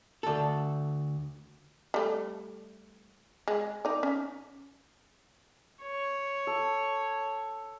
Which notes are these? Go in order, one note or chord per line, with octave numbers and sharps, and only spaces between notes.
D2 A4
G3 A3
G#3
D#4 D5
C#4
C#5
A4